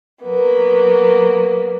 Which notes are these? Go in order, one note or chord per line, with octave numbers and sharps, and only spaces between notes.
F#3 A#3 B3